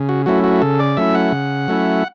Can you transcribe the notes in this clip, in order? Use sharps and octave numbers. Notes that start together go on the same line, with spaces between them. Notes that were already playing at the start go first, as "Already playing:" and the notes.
Already playing: C#3
F#4
F#3 A3 C#4 E4 F#4
F#4
C#3 A4
D5
F#3 A3 C#4 E4 E5
F#5
C#3
F#3 A3 C#4 E4